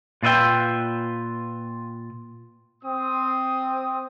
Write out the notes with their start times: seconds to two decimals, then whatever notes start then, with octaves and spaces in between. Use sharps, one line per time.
0.23 A#2 F4 B4 E5 G5
2.83 C4 D#6